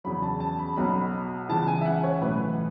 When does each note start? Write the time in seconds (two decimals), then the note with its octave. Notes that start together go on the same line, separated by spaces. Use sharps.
0.04 E2 C#3 F#3 B5
0.22 A5
0.40 A5
0.59 B5
0.76 B1 B2 F#3 B5
1.49 C#2 C#3 E3 A5
1.67 G#5
1.81 E5
1.86 F#5
2.03 C#5
2.21 B1 A2 E3 B4